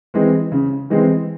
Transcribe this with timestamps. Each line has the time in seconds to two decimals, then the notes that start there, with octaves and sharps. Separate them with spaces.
0.14 E3 G#3 C4
0.52 C#3
0.90 E3 G#3 C4